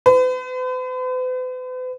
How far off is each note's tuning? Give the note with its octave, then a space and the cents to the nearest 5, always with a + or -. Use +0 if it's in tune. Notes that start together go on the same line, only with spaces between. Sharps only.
B4 +45